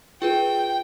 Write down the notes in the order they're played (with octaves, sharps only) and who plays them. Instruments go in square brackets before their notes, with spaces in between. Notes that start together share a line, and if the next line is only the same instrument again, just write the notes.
[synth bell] F4 G#4 B4 [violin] G5